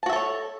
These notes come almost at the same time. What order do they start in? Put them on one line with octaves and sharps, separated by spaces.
A5 F#4 E5 A4 C#5